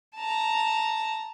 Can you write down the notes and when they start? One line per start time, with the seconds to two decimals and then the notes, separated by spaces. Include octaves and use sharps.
0.15 A5 A#5